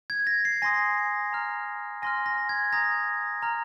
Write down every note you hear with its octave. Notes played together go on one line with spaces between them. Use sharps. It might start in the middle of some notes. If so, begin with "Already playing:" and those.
G#6
A#6
C7
G#5 C6 D#6 A#6
A#5 F6
G#5 C6 F6 A#6
A#6
G#6
A#5 D#6 A#6
A#5 F6